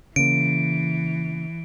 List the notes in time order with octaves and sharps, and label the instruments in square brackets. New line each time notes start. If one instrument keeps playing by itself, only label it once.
[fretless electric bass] C#3 A#3 [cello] E3 [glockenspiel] D7